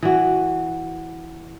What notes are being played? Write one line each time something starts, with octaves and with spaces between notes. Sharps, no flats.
E3 F#4